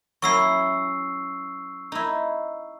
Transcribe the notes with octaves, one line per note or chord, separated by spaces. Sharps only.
F#3 C#4 E4 C#6 E6 C7
D#4 E4